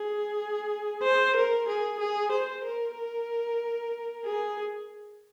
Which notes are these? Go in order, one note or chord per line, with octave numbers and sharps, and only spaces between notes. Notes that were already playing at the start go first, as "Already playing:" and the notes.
Already playing: G#4
C5
A#4
G#4
G#4
C5
A#4
A#4
G#4